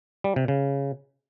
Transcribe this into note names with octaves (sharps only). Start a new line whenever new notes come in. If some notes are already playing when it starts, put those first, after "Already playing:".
G3
C3
C#3